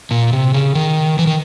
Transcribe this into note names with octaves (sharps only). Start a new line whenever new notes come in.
A#2
C3
C#3
D#3
E3
D#3